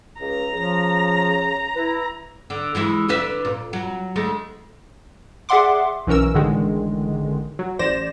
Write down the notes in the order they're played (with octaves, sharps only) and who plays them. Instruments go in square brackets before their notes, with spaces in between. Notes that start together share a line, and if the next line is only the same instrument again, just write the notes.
[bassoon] C#2 [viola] A#5
[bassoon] C#3 [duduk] F3
[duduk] E4 [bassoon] B4
[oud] D3
E3 G#3 E4
D3 B4 E5
A#2
F#3
D2 G#3 A3
[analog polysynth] G#4 D5 E5 F#5 C6 D6
B1 E3 C#4 A#4 E6
A1 A2 D3 D#3 G#3
F#3
A1 C5 D5 A#6 E7